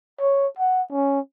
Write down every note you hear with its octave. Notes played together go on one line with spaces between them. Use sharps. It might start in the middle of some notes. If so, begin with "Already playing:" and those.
C#5
F#5
C#4